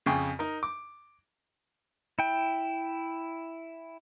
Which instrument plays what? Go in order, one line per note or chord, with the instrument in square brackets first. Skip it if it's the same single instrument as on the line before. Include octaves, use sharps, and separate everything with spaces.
[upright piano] F2 C#3 G#4 G5 C#6
D#4 A#4
D6
[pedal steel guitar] E4 G5